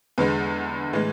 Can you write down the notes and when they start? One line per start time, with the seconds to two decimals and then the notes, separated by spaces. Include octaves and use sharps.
0.18 E2 D3 G#3 B4
0.93 A2 E3 G#3